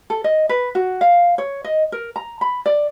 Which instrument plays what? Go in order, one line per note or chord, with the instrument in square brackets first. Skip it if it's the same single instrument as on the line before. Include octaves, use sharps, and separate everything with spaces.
[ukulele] A4
D#5
B4
F#4
F5
C#5
D#5
A#4
A#5
B5
D5